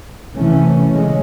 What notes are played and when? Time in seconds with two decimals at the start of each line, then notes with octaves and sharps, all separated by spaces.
0.36 C3 E3 A3 C#4
0.92 C#3 G#3 C#4